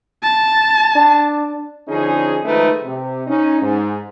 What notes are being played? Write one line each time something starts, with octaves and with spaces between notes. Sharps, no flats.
A5
D4
D3 F3 C#4 D#4 G#4
D#3 F3 G#3 A3 D#4 B4
C3
C#4 D#4
G#2